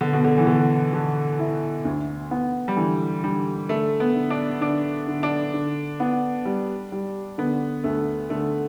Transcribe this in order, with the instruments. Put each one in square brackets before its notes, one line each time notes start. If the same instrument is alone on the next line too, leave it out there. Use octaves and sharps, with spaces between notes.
[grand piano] D3 [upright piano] B3
[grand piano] B2
D3
E3
[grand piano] D3 [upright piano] B3
[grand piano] D3 [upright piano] A4
[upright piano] E4
D2
B3
[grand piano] G3
[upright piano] D3 [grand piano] E3
[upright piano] D3 [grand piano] G3
[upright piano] D3 [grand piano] A3
[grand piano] B3
[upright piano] D3
[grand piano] D4
[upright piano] D3 [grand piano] D4
[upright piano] D3
[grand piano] D4
[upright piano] D3
B3
G3
G3
[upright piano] D3 [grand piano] B3
[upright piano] D2 [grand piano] A3
[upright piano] D3 [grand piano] A3